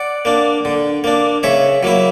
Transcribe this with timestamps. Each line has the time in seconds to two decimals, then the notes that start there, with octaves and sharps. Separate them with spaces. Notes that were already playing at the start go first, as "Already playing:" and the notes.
Already playing: D5 F#5
0.25 A#3 D4
0.65 D3
1.04 A#3 D4
1.43 C#3 C#5 E5
1.83 F#3 A#3 E4